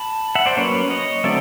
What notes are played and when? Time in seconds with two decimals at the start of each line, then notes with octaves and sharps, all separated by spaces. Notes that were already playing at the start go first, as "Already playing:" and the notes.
Already playing: A5 B5
0.35 E5 F#5
0.46 C5 D5
0.57 F#3 A#3 C#4 B4 C#5
0.90 C#5 D#5
1.24 D3 F#3 A3 C4 D5 E5